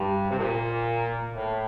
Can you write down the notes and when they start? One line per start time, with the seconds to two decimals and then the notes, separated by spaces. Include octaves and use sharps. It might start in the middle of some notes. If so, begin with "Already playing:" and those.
Already playing: G2
0.30 C3
0.39 A#2
1.34 A2